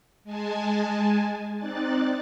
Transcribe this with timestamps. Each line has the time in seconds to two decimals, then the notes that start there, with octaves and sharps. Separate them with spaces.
0.24 G#3 G#5 A5
1.57 C4 D#4 D5 F#6 A6